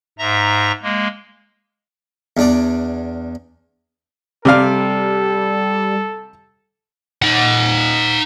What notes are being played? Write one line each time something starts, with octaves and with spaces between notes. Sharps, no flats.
G#2 E5 A#5 A#6
G#3 A#3
E2 D4 D5
C3 G3 A4 D5 F5
D#4 F#5